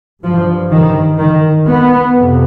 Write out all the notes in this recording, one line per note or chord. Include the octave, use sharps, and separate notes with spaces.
G2 F3
D#3
D#3
B3
F2 C3